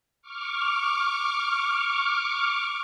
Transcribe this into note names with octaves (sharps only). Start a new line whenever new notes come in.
C#6 D6 F6